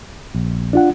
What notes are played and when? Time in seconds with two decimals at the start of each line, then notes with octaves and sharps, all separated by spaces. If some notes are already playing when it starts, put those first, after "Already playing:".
0.34 A#1
0.73 D4 F4 F#5